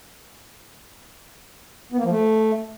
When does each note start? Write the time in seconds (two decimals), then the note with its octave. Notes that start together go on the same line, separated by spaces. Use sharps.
1.92 B3
1.98 A#3
2.04 F3
2.10 A3